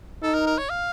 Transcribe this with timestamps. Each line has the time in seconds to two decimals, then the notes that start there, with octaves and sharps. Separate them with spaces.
0.23 D#4 A4
0.34 A#4
0.47 A#4
0.58 C#5
0.70 F5